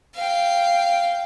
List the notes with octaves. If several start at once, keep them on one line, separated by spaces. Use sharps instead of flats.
F5 G5